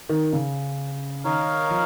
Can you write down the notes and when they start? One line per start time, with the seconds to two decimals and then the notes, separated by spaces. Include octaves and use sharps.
0.09 D#3
0.33 C#3
1.24 D#3 D#4 A#4 C#5 F5
1.70 F3